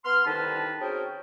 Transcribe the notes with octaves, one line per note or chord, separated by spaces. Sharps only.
B3 C6 F6
C2 D3 D#3 D#4 B4 A5
C4 C#4 F#4 G#4 A#4 G5